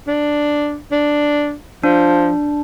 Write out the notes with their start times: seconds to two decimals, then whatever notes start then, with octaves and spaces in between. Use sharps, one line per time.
0.08 D4
0.92 D4
1.84 F3 D4